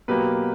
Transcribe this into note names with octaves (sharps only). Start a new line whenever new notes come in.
B2 F#3 A#3 G4 B4